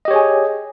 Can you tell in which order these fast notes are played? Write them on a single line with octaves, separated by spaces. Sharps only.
D#5 G4 C#5 G#4 G#5